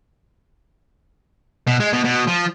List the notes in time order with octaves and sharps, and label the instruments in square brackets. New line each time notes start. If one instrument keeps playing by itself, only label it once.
[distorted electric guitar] B2
G#3
B2
B2
F3